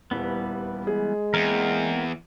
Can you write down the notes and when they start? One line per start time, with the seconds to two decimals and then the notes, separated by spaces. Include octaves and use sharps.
0.11 D#1 E2 E3 G3 B3
0.87 G#3 G#4
1.34 E2 A#3 C4 A#4